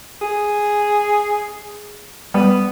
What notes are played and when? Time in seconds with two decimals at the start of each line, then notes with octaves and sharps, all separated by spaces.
0.22 G#4
2.34 G3 B3